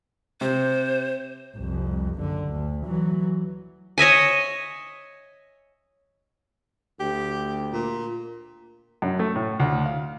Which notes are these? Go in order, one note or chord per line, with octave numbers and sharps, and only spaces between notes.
C3 C5
C2 F2
F#1 D3
D2
E3 F#3
C#5 D#5 E5 G#5
D2 G4
A#2
F#2
A3
A2
D2
F5